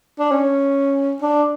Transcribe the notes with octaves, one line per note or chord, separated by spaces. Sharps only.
D4
C#4
D4